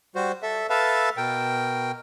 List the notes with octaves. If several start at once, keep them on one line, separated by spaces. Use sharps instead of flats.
G3 F#4 C5
A4 E5
A4 B4 E5 F5 A5
B2 A#4 G5